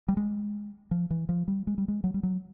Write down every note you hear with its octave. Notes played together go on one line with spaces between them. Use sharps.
G3
G#3
F3
E3
F3
G3
G#3
G3
G#3
F#3
G3
F#3